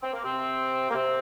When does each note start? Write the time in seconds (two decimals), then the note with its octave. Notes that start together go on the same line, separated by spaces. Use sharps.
0.03 C4
0.13 A#3
0.24 C3 C4
0.90 A#3
0.94 C3 C4